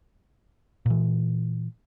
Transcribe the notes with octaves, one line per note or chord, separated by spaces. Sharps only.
A#2 E3